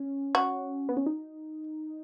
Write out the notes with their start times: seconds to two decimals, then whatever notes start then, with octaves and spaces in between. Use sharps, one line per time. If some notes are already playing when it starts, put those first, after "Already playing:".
Already playing: C#4
0.35 F#4
0.89 B3
0.97 C#4
1.06 D#4